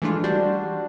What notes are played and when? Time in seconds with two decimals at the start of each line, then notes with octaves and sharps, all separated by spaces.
0.02 E3 G#3 A3 D4 F4
0.24 G3 D4 F#4 C5